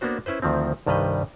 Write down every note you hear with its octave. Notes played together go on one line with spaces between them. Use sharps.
A#3 B3 D4 F#4 C5
C#4 E4 B4 C5
D2 D#3 F3 C4
C2 G2 D#3 G3 B4 D#5